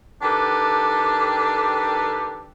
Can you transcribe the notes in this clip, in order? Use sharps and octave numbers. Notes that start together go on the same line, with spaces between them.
D#3 D4 G4 A4 B4